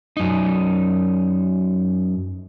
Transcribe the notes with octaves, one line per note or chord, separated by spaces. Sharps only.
F#2 D#4